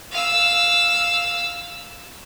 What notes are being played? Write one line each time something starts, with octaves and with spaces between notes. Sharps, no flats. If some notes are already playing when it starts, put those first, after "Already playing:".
F5 E6